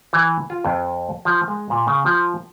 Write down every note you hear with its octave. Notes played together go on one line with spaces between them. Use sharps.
E3
F4
F2
F3
G#3
A#2
C#3
F3